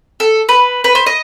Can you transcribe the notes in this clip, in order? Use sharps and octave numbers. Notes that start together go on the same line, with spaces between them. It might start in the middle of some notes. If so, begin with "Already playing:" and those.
A4
B4
B4
C5
D#5